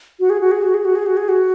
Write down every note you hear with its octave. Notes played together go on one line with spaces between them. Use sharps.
F#4
G#4
F#4
G#4
F#4
G#4
F#4
G#4
F#4
G#4
F#4